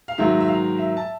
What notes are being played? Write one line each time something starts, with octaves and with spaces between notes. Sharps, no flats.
F5
G#2 D#3 F#3 A#3 E5
E5
F5
E5
A5